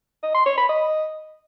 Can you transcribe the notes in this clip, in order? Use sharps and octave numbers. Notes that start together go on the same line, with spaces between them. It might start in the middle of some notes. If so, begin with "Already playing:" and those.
D#5
C6
C#5
B5
D#5